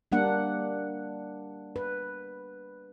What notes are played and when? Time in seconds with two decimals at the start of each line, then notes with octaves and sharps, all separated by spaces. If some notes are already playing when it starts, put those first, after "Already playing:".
0.12 G3 A#3 D4 F#5
1.76 B4